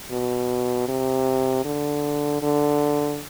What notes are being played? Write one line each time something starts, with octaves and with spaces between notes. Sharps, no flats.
B2
C3
D3
D3